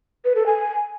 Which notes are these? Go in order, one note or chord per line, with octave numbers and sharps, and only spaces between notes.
B4
A4
G#5